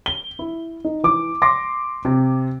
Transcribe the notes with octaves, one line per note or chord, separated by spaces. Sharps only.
G7
E4
D#4
E3 D6
C6 D6 A#6
C3